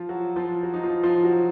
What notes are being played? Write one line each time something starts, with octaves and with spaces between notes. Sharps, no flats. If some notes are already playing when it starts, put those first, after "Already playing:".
Already playing: F3 F4
F#3 F#4
F3 F4
F#3 F#4
D#4
F3 F4
F3 F4
F#3 F#4